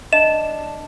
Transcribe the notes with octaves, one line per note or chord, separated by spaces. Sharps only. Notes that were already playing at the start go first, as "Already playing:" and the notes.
D4 D#5 E7